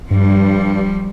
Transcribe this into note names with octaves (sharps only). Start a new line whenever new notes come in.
G2 F3 G3